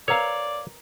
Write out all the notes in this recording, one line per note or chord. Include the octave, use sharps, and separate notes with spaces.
A#4 B4 C#5 D5 F5 A#5